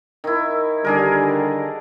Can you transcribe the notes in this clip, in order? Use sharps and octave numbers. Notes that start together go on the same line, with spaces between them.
D#3 E4
D3 D#3 G3 D4 G#4 A#4